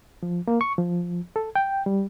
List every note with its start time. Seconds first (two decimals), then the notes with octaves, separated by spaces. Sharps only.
0.23 F3
0.48 A#3
0.61 C#6
0.78 F3
1.36 A4
1.56 G5
1.86 G3